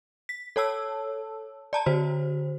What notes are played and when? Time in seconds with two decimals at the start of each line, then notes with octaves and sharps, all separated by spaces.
0.29 B6
0.56 A4 C#5 A5 E6
1.73 D5 A5 A#5
1.86 D3 F#4 C5